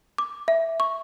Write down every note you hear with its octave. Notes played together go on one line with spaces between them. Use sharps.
D6
E5
C#6